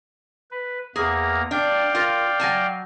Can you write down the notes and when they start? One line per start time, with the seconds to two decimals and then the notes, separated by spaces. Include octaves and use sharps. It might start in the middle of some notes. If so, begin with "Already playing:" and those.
0.51 B4
0.96 E2 A#3 G#4 A#5
1.51 D4 D5 F5 G5
1.95 F4 A#4
2.40 F#3 G#5 A5